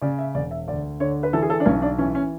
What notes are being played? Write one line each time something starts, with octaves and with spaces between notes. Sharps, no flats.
C#3 D5
E5
E1 D5
E5
D2 D5
D3 C#5
B4
E3 A4
G#4
A4
D4
B1 C#4
D4
E3 C#4
C#4